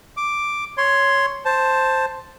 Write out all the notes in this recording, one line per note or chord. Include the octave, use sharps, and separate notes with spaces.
D6
C#5 C6
C5 A5